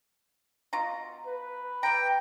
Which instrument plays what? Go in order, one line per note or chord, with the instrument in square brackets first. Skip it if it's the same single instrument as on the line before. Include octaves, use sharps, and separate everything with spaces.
[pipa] B2 F4 A#5
[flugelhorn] B4
[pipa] G3 A#5 [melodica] G5